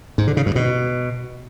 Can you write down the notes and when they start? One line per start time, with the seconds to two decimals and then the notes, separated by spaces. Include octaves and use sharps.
0.18 G#2
0.27 D3
0.37 C#3
0.46 G2
0.55 B2